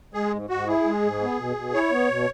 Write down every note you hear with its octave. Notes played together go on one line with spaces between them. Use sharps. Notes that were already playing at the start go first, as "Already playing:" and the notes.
G#3 G#4
G#2
G#2 F#4
E4 G#4
G#3
G#2
B3
B2
B2
E4 C#5
B3
B2